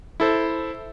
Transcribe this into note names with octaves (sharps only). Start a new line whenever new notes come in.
E4 A4 C5